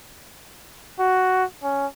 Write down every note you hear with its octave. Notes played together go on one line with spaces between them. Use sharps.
F#4
C#4